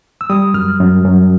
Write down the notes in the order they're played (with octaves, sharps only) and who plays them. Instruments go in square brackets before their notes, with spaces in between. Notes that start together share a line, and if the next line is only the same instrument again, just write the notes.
[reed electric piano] E6
G3 D#6
F#2 F6
F#2
F#2